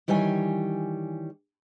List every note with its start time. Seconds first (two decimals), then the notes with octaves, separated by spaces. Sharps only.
0.08 D#3 E3 G3 G4 C#5 G#5